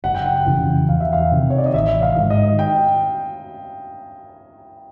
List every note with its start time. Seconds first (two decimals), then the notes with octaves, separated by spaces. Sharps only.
0.04 F#1 F#5
0.15 G5
0.26 F#5
0.47 F2 C#3 E3
0.89 E2 F5
1.00 E5
1.13 F5
1.32 C3 D#3
1.50 C#5
1.58 D5
1.66 D#5
1.74 A1 E5
2.02 F5
2.16 G#2 D#3
2.30 D#5
2.59 G5